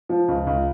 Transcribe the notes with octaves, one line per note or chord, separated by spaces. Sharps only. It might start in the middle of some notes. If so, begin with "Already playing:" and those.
F3
C#2
C#2